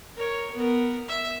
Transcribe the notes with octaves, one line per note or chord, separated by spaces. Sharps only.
A#4 C#5
B3 A#4
E5